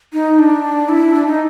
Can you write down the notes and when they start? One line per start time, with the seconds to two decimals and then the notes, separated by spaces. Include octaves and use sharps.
0.13 D#4
0.39 D4
0.89 E4
1.14 D4
1.27 D#4